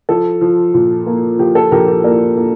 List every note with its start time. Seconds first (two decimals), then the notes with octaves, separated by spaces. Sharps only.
0.09 F3 A4
0.41 F3
0.74 A#2
1.06 A#3
1.39 F3 G4
1.55 A4
1.71 A#1 G4 A#4
1.88 G4 A#4
2.04 A#3 A#4 D5
2.37 A#3